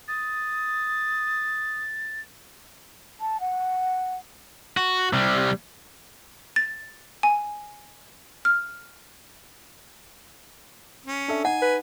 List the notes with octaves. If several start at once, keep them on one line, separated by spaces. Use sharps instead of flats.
D#6 A6
A5
F#5
F#4
C3 G3
A6
G#5
F6
C#4
D4 A4 E5
D#4 F#5 G#5
B4